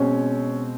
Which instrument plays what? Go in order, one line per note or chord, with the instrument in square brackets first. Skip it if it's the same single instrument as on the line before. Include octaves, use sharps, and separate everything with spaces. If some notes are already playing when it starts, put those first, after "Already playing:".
Already playing: [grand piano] B2 G#3 C4 [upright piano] C#4